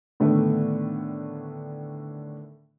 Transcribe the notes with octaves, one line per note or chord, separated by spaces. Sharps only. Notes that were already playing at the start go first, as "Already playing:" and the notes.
A2 D3 D#3 A3 B3